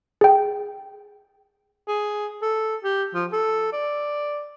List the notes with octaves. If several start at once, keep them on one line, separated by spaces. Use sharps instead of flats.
G#4 G5
G#4
A4
G4
F3
A4
D5